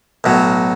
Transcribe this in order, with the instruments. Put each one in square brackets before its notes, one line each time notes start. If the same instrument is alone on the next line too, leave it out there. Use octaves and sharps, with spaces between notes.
[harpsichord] B1 A2 F#3